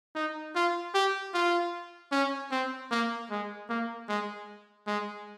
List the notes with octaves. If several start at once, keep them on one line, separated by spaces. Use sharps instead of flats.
D#4
F4
G4
F4
C#4
C4
A#3
G#3
A#3
G#3
G#3